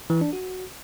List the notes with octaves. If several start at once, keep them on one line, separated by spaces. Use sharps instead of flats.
E3
D4
F#4